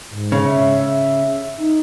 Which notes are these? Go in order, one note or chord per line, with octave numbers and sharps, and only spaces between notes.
G#2
C#3
E5
D#4